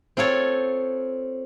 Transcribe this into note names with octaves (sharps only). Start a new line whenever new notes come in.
C4 F4 A4 C#5